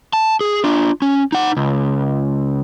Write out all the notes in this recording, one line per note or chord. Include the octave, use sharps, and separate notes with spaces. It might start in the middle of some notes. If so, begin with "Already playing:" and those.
A5
G#4
D4 F4
C#4
D#4 F#5
C#2